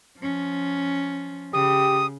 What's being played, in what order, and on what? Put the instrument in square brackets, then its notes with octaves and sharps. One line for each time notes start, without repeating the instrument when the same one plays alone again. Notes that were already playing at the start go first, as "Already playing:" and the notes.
[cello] F3 C#4
[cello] C#3 [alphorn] G4 [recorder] D#6